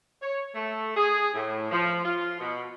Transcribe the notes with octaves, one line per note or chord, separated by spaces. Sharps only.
C#5
A3
G#4
A2
F3
F4
B2